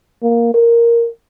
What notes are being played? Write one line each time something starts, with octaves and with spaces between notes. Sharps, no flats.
A#3
A#4